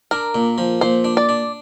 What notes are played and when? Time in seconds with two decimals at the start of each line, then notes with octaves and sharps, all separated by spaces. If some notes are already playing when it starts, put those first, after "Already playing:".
0.11 D4 A#4
0.35 A#2
0.58 F3
0.81 A#2 C5
1.04 D4
1.17 D5
1.29 D4